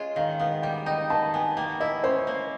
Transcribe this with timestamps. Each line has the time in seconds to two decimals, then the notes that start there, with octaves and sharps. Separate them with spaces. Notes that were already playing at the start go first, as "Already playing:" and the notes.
Already playing: G#3 C#4 F4 G#4
0.16 D#3 F5
0.39 B3 F5
0.62 G3 G5
0.86 D#4 G5
1.10 D#3 A5
1.34 B3 G#5
1.56 A#3 G5
1.80 E4 D#5
2.04 C#4 C5
2.27 A#3